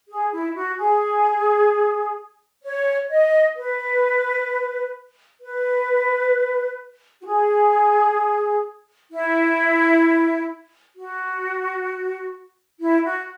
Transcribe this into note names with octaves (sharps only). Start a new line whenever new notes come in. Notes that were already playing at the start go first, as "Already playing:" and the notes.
G#4
E4
F#4
G#4
C#5
D#5
B4
B4
F#4
G#4
E4
F#4
E4
F#4